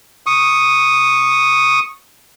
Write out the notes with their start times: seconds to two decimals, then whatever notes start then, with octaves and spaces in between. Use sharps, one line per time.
0.26 C#6 D#6